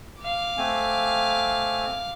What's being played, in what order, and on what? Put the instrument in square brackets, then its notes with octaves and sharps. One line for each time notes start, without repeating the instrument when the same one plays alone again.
[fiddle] F5 D6
[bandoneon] A3 C4 G#5